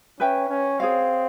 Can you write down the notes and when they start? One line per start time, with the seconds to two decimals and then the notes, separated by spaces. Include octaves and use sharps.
0.20 C#4 B4 E5 G5
0.49 C#4
0.80 C4 G#4 C#5 F5